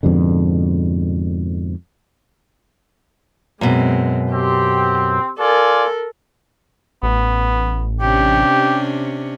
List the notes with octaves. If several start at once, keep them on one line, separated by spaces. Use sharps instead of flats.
F2 G#2 B2 D3
F#2 B2 G#3 C4
C4 G4
F4 A4 A#4 D5 G#5
A1 B3
C3 C#4 D4 G4